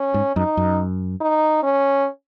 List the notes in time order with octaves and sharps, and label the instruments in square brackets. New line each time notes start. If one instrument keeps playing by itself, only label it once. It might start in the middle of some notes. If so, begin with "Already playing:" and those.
Already playing: [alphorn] C#4
[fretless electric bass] G#2
[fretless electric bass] F#2 [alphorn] D#4
[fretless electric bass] F#2
[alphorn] D#4
C#4